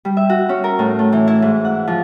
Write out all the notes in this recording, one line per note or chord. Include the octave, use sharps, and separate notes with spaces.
G3
E5
F#4
C#4
A#4
A2
A3
E3
E4
G#2
F#5
F3